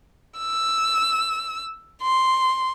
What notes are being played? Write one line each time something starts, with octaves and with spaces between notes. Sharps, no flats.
E6
C6